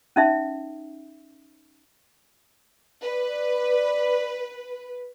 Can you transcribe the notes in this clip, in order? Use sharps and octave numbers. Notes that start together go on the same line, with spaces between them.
C#4 D#4 E5
B4 D5